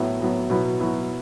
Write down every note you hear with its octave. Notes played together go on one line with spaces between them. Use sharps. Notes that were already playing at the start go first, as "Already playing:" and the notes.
Already playing: A2 F#3 B3
A2 F#3 B3
B2 F#3 B3 E4
B2 F#3 B3 E4